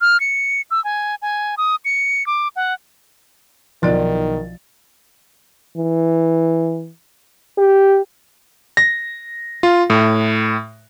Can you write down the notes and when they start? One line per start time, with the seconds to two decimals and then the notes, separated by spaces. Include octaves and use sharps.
0.01 F6
0.20 C#7
0.71 E6
0.84 G#5
1.22 G#5
1.58 D#6
1.85 C#7
2.27 D6
2.56 F#5
3.83 B1 D#3 F3 E4 D5 C6 A6
5.77 E3
7.58 G4
8.77 A#6
9.63 F4
9.90 A2